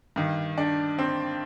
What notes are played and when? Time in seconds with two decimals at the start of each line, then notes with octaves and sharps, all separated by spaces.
0.16 G2 D#3
0.58 D4
0.99 C4